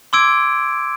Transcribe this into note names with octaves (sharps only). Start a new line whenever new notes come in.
C6 D6 E6 G#6 D7